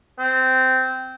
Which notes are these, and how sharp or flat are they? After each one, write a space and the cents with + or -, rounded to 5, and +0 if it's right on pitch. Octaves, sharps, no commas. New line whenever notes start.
C4 -15